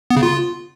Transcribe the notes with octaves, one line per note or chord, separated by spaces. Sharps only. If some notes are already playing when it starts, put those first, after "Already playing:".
B3
C#3
F4